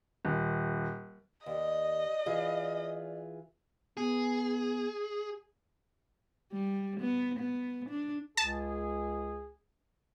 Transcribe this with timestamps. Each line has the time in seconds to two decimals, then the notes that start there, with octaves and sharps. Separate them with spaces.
0.25 D#1
1.46 D#2 D5 D#5
2.26 E3 F4 G#4
3.97 B3 G#4
6.52 G3
7.00 B3
7.39 B3
7.89 D4
8.37 C#2 G#4 A5